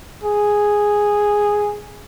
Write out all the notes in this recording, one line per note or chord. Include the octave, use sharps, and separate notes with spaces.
G#4